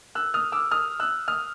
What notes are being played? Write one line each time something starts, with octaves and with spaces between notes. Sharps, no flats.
E6 F#6
D#6 F6
D6 E6
D#6 F6
E6 F#6
D#6 F6